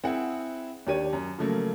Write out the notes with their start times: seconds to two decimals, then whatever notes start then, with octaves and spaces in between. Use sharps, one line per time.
0.04 C4 E4 G#4 F#5
0.87 D#2 D4 G4 C#5 D#7
1.13 F#2
1.38 C#3 F3 F#3 A3 A#3 C#4